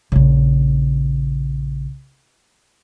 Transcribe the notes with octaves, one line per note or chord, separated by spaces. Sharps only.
A#1 C#3